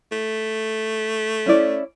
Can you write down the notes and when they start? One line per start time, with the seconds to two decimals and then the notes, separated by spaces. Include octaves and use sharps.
0.12 A3
1.46 C#4 E4 D5